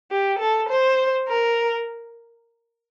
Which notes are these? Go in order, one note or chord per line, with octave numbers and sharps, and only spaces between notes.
G4
A4
C5
A#4